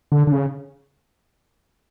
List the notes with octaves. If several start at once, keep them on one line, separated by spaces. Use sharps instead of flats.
D3
D3
C#3